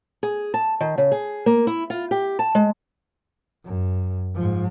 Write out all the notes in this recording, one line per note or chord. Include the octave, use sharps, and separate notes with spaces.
G#4
A5
D#3
C#3
G#4
A#3
E4
F4
G4
A5
G#3
F#2
G#2 F3